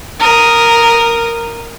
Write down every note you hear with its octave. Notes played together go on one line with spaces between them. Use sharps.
A#4 D#6